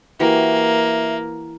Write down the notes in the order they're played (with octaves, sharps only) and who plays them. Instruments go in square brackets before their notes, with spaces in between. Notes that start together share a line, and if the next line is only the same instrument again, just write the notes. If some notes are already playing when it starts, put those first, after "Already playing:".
[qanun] E3 F#4 G4 [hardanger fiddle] A#3 [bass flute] E5